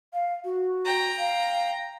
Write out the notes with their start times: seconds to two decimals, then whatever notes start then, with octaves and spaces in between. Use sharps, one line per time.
0.13 F5
0.44 F#4
0.85 G5 A#5
1.18 F5